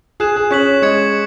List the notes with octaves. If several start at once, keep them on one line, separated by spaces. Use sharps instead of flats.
G#4 F#6 E7
G#4
C#4 C#6 F#6 B6 F#7
G#3 C#6 G#6 C#7